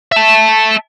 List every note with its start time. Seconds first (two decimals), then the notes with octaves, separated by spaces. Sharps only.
0.12 E5 A5